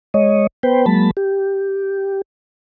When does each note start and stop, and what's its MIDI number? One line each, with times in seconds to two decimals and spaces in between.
0.14 0.47 56
0.14 0.47 73
0.14 0.47 75
0.63 0.85 59
0.63 0.85 71
0.63 0.85 72
0.63 0.85 79
0.86 1.11 54
0.86 1.11 56
0.86 1.11 58
0.86 1.11 81
0.86 1.11 83
1.17 2.21 67